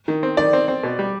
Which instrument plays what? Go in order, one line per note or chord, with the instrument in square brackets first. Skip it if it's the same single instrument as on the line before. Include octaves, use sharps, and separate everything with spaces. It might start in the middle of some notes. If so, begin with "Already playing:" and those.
[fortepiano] D#3
C4
[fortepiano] D#3 [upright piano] D5
[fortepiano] C4
C4
B2
G3